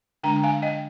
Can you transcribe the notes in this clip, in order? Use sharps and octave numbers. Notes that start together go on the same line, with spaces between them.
D3 G#3 D4 G5 A#5
F5 G#5
D#5 G5